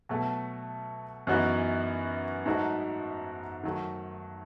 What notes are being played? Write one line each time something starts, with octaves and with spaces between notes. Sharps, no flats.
B2 F#3 A3
F#2 E3 B3 D#4 F#4
G#2 F#3 A3 D#4 F#4
D#3 F#3 A3